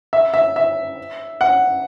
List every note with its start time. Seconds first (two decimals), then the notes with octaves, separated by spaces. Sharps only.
0.13 E5
0.34 E5
0.56 E5
1.41 F#5